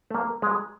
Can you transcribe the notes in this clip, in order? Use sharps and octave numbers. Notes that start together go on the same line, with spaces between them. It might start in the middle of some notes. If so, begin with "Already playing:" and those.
A3
A#3
G#3